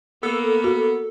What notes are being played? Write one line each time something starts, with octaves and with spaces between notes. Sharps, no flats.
A#3 B3 A4
F#4